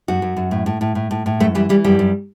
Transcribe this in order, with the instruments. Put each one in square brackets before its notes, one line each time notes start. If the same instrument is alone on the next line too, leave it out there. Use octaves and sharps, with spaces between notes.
[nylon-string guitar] F#2 F#4
F#2
F#2
A2
A2
A2
A2
A2
A2
F#2 A3
E3 G3
E3 G3
F#2 G3
F#2